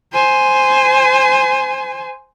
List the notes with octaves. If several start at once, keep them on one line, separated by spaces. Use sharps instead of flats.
C5 G#5